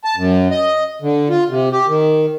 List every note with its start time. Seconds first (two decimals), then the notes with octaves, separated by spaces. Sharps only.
0.04 A5
0.16 F#2
0.51 D#5
1.02 D3
1.29 F4
1.49 C3
1.72 G4
1.87 D#3